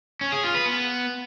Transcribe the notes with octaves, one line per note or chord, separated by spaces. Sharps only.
C#4
G#4
F4
B4
B3